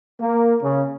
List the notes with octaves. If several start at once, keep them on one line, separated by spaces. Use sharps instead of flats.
A#3
C#3